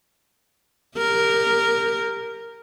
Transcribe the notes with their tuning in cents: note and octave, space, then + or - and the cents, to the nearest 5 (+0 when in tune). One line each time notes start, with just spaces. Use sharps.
G4 +25 A#4 -5